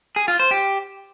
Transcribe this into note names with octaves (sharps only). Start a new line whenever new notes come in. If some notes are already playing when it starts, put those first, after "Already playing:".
G#4
F4
C5
G4